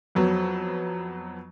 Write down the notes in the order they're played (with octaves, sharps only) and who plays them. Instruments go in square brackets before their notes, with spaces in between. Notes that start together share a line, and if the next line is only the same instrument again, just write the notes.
[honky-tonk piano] F2 F#3 B3